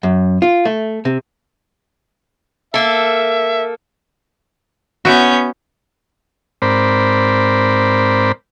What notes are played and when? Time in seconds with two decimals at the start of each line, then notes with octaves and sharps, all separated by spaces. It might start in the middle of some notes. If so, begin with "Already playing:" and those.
0.03 F#2
0.42 F4
0.65 A3
1.05 C3
2.74 A#3 A4 E5
5.05 B3 C#4 E4 F#4 G6
6.62 G#2 C4 A#4 C5 D5 B5